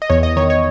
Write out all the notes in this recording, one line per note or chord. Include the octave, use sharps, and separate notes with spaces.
D#5
E2 C#5
D#5
D#3 C#5
C#5